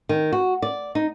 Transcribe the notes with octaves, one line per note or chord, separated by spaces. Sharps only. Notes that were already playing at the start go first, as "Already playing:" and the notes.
D#3
F#4
D5
D#4